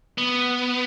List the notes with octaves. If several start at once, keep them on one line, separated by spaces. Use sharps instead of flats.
B3